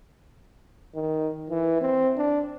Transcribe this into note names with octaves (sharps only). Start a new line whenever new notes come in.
D#3
E3
C4
D4